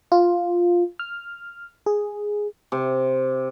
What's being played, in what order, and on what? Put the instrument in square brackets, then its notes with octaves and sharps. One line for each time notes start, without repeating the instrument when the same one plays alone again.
[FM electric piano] F4
F6
G#4
[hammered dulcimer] C3